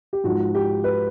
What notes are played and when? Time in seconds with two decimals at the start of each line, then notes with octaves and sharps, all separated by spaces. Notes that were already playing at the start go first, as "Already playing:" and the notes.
0.13 G4
0.24 G#2 F3 F#4
0.55 G4
0.84 B4